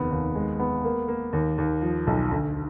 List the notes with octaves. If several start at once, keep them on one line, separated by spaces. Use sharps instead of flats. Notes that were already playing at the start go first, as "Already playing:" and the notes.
Already playing: F1 D#2 B3
D#2
G#3
B3
A#3
A#3
D#2
D#2
F3
B1
D2